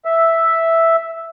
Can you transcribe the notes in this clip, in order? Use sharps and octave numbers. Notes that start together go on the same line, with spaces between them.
E5